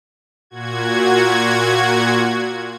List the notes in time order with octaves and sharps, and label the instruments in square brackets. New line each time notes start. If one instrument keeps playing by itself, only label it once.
[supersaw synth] A#2 F#4 G#6